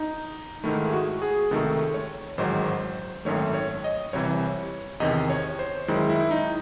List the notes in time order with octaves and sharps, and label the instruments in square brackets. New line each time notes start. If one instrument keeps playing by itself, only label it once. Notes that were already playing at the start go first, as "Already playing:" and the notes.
Already playing: [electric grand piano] D#4
G#2 D#3 A3 E4
G#4
F#4
G#4
C#2 C3 D#3 A3 A4
C#5
A1 G#2 D#3 F#3 C5
G#1 F#2 D#3 A3 C#5
C#5
D#5
C2 C3 E3 C#5
E2 C3 D#3 D#5
C#5
C5
F#2 D#3 G#3 E4
E4
D#4